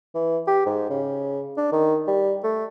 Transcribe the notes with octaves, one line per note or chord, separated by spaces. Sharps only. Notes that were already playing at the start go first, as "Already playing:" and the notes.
E3
G4
G#2
C#3
D4
D#3
G3
A3